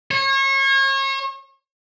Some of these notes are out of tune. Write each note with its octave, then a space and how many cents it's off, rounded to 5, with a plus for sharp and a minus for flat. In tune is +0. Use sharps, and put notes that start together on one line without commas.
C#5 -35